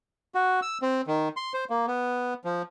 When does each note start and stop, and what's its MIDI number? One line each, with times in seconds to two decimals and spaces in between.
0.35 0.60 66
0.62 0.78 88
0.82 1.01 60
1.07 1.28 51
1.37 1.53 84
1.54 1.65 72
1.70 1.86 58
1.87 2.34 59
2.45 2.62 53